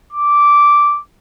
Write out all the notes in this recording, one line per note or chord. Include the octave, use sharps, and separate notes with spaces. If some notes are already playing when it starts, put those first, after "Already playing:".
D6